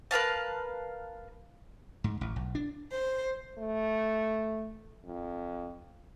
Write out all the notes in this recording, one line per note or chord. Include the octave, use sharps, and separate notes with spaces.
A#4 B4 F5 A5
G#2
A1
B1
D4
C5
A3
F2